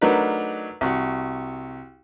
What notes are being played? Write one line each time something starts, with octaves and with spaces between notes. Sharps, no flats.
F#3 A3 D4 D#4 A#4 B4
C2 F#4